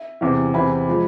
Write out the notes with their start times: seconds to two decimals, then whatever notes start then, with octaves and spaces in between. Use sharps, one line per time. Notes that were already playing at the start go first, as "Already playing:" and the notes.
Already playing: E5
0.21 E2 C3 E3
0.54 E2 C3 E3 G#5 B5
0.89 F3 G#3